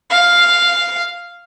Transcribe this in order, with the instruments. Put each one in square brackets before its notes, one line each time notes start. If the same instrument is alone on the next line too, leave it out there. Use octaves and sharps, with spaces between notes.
[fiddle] F5